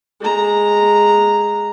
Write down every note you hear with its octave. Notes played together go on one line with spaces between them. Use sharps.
G#3 A#5